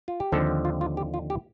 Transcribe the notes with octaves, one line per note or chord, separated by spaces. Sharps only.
F4
G4
D#2 D3 F3 C4 A4
F4
F4
G4
F4
G4